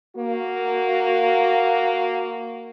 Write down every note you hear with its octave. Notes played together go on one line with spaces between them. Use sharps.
A#3 F#4